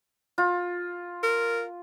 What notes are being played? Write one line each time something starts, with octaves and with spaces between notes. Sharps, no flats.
F4
A#4